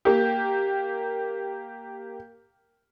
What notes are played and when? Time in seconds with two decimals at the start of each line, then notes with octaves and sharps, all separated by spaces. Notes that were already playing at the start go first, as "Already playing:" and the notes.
0.05 A#3 G4